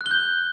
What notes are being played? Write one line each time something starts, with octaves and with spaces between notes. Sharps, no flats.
F#6
G7
G6